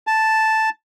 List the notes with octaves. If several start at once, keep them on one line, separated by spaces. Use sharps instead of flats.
A5